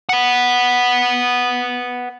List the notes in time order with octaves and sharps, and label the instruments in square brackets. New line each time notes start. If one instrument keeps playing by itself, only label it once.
[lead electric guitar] B4 F#5